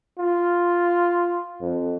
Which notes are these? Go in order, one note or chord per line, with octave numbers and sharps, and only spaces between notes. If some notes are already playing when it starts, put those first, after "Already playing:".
F4
F2